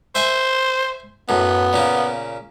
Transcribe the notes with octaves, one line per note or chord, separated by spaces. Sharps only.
C5 E5 G#5 C#6
F#2 A2 B3
A#2 C#3 A#3